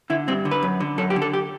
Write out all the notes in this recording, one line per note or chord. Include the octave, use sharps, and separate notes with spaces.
D3 E4
G2 C4
D3
B4
F#2
D3
F#2 A4
G4
D3
A4
G4